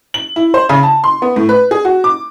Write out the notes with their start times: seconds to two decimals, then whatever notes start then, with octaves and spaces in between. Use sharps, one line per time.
0.14 F#7
0.36 E4
0.54 C5
0.69 C#3
0.83 A5
1.04 C6
1.22 B3
1.36 A2
1.49 B4
1.71 G#4
1.85 F#4
2.04 D6